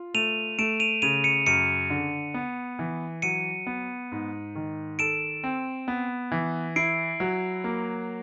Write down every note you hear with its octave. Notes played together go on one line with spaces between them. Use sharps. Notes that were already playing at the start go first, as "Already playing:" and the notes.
Already playing: F4
A3 D#7 F7
A3 D7 E7
D#7 F7
C#3 D#7 F7
C#7 D#7
F#2 C#7 D#7
D3
B3
E3
F#3 C#7 D#7
B3
G#2
D#3
A4 D7 E7
C4
B3
E3
E4 C7 D7
F#3
A#3